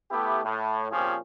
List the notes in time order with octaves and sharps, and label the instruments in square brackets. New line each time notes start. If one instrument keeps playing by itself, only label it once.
[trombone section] A3 B3 E4 G4
A2
A#2 F3 C4 C#4 G4 G#4